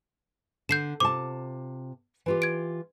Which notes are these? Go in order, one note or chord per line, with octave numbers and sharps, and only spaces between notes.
D3 G6 C7 E7
C3 F4 A5 D6
E3 F4 G4
G#6 D7